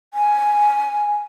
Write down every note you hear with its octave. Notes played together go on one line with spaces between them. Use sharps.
G#5